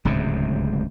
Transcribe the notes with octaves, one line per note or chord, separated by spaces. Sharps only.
D1 C#2 G#2 C3